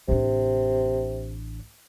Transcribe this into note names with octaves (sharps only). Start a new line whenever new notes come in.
A1 C3 D4